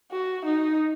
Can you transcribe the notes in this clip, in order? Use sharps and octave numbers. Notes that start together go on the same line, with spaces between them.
F#4
D#4